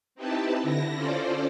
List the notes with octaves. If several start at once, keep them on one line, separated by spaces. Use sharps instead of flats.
C4 D#4 E4 G4 B4 A5
D3 E4 A#6
C#4 F4 A4 C5 D5